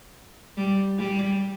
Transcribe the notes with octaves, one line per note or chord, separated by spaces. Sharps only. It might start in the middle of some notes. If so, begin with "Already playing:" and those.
G3
G3